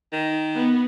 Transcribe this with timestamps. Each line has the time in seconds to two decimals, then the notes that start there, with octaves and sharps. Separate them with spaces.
0.12 D#3
0.56 B3